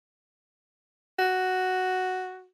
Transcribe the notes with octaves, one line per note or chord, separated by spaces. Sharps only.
F#4